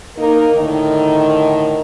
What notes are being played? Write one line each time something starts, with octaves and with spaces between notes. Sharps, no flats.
A#3 D#4 A#4
A2 D3 D#3